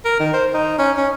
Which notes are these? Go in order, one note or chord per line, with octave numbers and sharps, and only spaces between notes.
A#4
D#3
C5
D#4
C#4
C#4